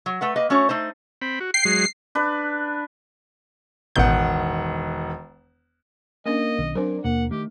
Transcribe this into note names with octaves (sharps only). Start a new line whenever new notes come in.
F#3
A3 B4 F#5
A#3 B4 D#5
A3 C#4 F#4 C#5
A3 D#4 C5
C4 B5
F#4
G5 C7
F#3 G#3
D4 B4
E1 A1 B2 D#3 F#5 G6
A#3 C#4 D4 D#5
B1 D#3 B3
F#3 C4 D4 A#4 C5 D5
D#2 B2 A#3 F#5
D#3 A3 G4